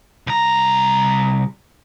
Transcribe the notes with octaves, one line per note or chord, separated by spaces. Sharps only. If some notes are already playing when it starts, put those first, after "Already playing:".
C2 A#5